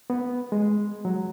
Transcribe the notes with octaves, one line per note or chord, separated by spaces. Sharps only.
B3
G#3
F#3